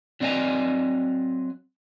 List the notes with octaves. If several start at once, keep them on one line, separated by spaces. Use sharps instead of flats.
F#3 C4 D5 D#5 G#5 A#5